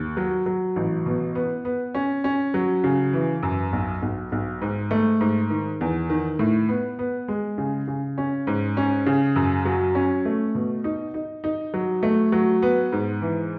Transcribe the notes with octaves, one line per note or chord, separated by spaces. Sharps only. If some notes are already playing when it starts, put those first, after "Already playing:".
Already playing: D#2
F#3
F#3
A1
B2
B3
B3
C#4
C#4
F#3
C#3
E3
F#2
B1
B1
B1
G#2
A3
G#2
D#3
E2
D#3
A2
B3
B3
G#3
C#3
C#3
C#4
G#2
C#4
C#3
F#2
F#3
C#4
A3
B2
D#4
D#4
D#4
F#3
A3
F#3
B3
G#2
E3